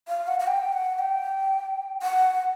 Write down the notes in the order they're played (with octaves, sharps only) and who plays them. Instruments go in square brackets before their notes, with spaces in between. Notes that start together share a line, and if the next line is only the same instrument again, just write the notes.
[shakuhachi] F5
F#5
F#5
G5
F#5
G5
F#5